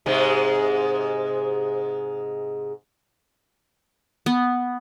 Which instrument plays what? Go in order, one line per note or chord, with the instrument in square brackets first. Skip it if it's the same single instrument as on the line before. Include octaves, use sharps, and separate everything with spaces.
[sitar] G#2 C3 G#3
[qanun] B3